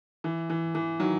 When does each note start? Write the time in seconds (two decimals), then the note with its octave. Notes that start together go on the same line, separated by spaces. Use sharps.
0.24 E3
0.50 E3
0.75 E3
0.99 D#3 F#3